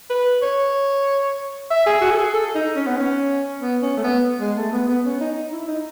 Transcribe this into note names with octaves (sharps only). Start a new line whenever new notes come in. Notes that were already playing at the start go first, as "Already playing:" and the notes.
B4
C#5
E5
G#4
F#4
A4
G#4
A4
D#4
C#4
B3
C#4
B3
C#4
A3
B3
G#3
A3
B3
B3
C#4
D#4
D#4
E4
D#4